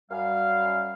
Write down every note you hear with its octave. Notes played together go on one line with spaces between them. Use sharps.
F#2 G3 F5